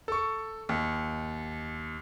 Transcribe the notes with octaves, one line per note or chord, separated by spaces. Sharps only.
A4 C#6
D#2